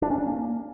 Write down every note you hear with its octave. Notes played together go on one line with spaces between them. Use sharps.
D4
C#4
D4
A#3